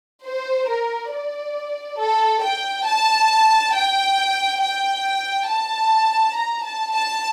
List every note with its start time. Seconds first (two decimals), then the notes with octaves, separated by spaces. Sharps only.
0.25 C5
0.68 A#4
1.12 D5
1.99 A4
2.42 G5
2.87 A5
3.74 G5
4.61 G5
5.48 A5
6.35 A#5
6.64 A5
6.93 A5